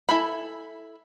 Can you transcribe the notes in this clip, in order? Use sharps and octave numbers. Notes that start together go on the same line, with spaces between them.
E4 A4 G#5 B5